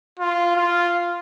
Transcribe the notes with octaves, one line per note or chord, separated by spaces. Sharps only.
F4
F4